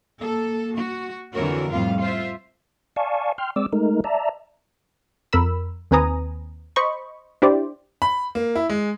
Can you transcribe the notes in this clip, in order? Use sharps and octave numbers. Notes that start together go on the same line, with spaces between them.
A#3 A4
F#4
F2 D3 E3 F#4 A#4 C#5
F2 A2 G3 F4 F5
F4 C5 E5
D5 F5 G#5 A5 C#6
G5 C6 F6
G#3 C4 D5 D6 E6
G#3 A3 D#4 A#4
D5 E5 A5 A#5
F2 A#4 B5 E6
D#2 C4 B4 G#5 A#5 D#6
C5 D#5 B5 C#6
D4 E4 G4 C5 D5
B5
A#3
E4
G#3